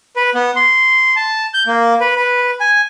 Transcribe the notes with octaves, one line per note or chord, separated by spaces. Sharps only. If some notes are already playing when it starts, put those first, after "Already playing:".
B4
B3
C6
A5
G6
A#3
B4
B4
G#5